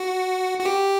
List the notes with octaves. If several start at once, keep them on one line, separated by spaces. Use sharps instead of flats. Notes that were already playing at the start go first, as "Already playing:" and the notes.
Already playing: F#4
F#4
G4